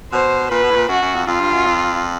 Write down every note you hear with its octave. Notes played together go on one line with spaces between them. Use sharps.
B2 C5
A#2 B4
B2
A2
A#2
F#2 F#4
F#2
F2
F2 F4
G2
F#2
F2